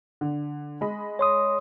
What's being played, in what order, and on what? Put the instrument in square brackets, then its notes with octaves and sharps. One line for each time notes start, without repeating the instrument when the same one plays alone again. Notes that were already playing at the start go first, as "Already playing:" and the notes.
[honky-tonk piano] D3
G#3 D#5 B5
[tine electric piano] C#5 C6 D#6